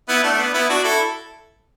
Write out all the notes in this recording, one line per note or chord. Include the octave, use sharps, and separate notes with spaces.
B3 E4
A3 D4
D4
B3
B3 E4
D4 F#4
E4 A4